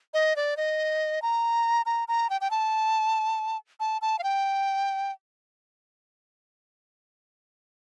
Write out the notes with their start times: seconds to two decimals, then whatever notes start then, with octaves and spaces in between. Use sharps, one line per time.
0.14 D#5
0.36 D5
0.57 D#5
1.22 A#5
1.86 A#5
2.08 A#5
2.30 G5
2.41 G5
2.51 A5
3.80 A5
4.02 A5
4.19 F5
4.24 G5